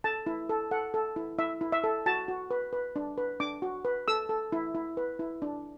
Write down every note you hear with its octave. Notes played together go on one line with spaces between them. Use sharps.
A4 A5
E4
A4
A4 F#5
A4
E4
E4 E5
E4
E5
A4
F#4 A5
F#4
B4
B4
D4
B4
D4 D6
F#4
B4
A4 E6
A4
E4
E4
B4
E4
D4